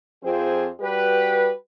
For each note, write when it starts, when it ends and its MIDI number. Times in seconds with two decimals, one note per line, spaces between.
0.23 0.67 41
0.23 0.67 53
0.23 0.67 60
0.23 0.67 65
0.23 0.67 68
0.23 0.67 72
0.80 1.51 55
0.80 1.51 66
0.80 1.51 67
0.80 1.51 71